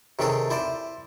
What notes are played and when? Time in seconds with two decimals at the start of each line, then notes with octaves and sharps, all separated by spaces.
0.19 C3 D#3 C#4 G#4 A4
0.50 E4 C5 D5